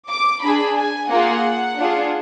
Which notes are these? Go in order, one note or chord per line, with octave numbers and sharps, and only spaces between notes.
D6
D4 G#4 B5
G#5
A#3 F4 G#4 F#5
D4 F4 G#4